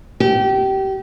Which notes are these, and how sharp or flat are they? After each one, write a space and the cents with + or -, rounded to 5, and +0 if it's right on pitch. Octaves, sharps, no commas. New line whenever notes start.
G4 -25